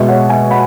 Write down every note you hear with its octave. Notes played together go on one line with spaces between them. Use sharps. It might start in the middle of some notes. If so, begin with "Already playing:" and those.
Already playing: B2 G#3 E5
C#5 F#5
E5 G#5
F#5 B5